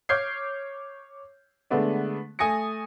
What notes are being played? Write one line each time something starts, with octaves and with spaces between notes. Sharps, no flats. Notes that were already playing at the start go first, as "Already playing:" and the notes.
C#5 D6 F6 G6 G#6 C7
D3 G#3 A3 B3 D4
A3 G#5 D#6 A#6 C#7